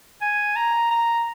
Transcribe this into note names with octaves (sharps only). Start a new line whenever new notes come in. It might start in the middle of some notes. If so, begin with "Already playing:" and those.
G#5
A#5
A#5